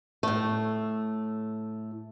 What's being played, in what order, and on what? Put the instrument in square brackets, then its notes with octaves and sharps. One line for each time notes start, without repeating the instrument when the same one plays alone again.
[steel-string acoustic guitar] A2 A3